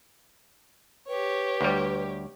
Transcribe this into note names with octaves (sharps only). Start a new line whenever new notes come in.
G4 B4 C#5
D2 G3